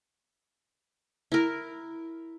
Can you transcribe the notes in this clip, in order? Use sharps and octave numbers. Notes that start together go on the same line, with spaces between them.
E4 A#4